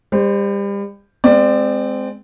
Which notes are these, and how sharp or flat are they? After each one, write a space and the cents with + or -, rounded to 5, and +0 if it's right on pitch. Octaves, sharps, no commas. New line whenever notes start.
G3 +35 C5 +0
G#3 +0 C4 -15 D5 +25